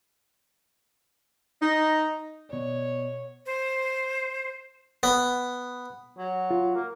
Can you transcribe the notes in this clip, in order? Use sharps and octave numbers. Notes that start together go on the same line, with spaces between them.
D#4
B2 C#5 D5
C5
B3
F#3
F4
A#3